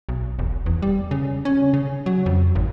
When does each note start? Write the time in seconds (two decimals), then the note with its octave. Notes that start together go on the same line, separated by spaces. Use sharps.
0.09 B1
0.39 E1
0.66 E2
0.82 G3
1.11 C#3
1.45 C#4
1.74 C#3
2.06 F#3
2.26 F2
2.55 G#1